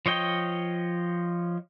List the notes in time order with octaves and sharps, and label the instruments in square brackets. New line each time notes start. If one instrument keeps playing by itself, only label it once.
[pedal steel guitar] F3 C#5 D#5 G5